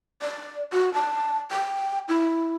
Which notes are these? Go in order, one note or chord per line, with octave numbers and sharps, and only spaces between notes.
D5
F#4
A5
G5
E4